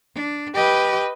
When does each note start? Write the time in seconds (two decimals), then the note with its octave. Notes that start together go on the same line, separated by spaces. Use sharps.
0.15 D4
0.55 G4 B4 D#5